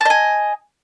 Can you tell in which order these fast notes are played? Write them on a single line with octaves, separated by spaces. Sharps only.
A5 D#5 G#5